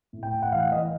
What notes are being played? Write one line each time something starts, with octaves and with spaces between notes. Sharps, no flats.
A2
G5
A2
F#5
E3 F5
E3 D#5